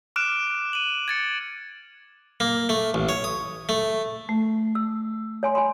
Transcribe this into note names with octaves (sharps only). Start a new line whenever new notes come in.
D6 F6 F#6 D7 E7
D#7 F#7
G#6 A6 C#7
A#3
A3
A1
C#5
D#6
A3
A3
E6
C#5 G#5 C6
G#5 B5 C6